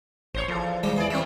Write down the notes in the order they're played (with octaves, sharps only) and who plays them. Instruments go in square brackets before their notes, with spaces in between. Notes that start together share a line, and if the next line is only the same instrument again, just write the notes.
[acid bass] A1 [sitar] C5 C#5
[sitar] E2 A4 [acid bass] F3
[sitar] D#3 [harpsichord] G3 G#3 G4
[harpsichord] E2 E3 [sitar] G#4 D5
[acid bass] E3 [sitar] A3 C4 [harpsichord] C5 E5